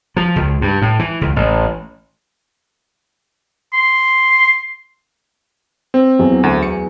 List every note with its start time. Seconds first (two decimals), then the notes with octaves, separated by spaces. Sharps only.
0.16 F3
0.36 C#2
0.61 G2
0.82 A2
0.99 E3
1.21 C#2
1.36 A1
3.73 C6
5.94 C4
6.19 E2 F#3
6.43 D2
6.63 C#7